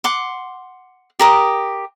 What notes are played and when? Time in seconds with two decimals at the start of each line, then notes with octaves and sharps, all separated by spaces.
0.04 F#5 C6 D6
1.19 G4 A#4 D#6